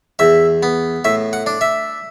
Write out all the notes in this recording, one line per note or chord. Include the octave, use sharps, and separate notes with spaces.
E2 E5
B3
A2 E5
F#5
D4
E5